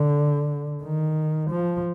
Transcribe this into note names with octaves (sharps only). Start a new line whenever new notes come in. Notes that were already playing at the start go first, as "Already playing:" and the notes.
Already playing: D3
D#3
F3